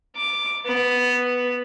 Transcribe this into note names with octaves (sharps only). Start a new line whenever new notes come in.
D6
B3